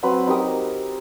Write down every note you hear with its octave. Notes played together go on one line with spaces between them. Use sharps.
F#3 C4 B4 F#5
D#4 G4 A#4 D#6